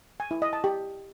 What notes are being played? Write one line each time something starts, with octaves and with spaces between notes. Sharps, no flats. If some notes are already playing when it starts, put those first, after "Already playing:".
G#5
E4
D#5
A5
G4